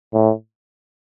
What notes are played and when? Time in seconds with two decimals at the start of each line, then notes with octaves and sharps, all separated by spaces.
0.14 A2